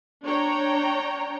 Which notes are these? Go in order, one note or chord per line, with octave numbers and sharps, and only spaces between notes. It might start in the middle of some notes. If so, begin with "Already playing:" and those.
D4 C#5 G5 A#5